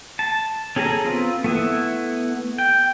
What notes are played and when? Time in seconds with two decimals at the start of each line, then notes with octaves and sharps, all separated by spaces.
0.19 A5
0.76 C#4 G#4 A4 G#5 A#5
1.05 B3 C4 F4
1.44 A3 B3 E4
2.58 G5